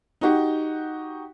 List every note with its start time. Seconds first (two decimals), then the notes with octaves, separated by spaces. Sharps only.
0.21 D#4 F#4 G4